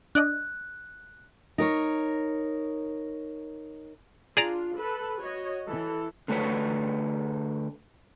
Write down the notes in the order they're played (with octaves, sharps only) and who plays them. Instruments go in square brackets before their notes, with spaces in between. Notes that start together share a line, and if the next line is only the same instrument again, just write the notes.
[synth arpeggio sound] D4 D5 D#5 [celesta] F#6
[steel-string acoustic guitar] D#4 A#4 C#5
[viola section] D4 F4 [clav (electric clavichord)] G#4 D5 A#5
[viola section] A4 B4
F#4 C#5 D#5
E3 A4
[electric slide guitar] D3 A3 F#4 B4 C#5